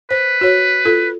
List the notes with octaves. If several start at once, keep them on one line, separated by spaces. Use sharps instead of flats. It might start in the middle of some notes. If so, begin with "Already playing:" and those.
B4 C5
F#4 C#5
F4 A4